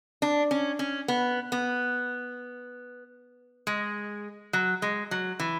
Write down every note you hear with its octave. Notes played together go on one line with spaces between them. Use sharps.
D4
C#4
C#4
B3
B3
G#3
F#3
G#3
F#3
E3